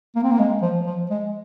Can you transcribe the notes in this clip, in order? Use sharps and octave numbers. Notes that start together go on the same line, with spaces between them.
A#3
C4
A#3
G#3
F3
F3
G#3